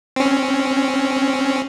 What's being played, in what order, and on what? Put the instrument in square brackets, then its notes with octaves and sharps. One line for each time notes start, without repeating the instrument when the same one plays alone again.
[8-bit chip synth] C4 C#4